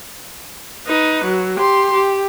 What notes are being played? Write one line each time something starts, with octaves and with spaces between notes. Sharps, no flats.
D#4 B4
F#3
G4 C6
G4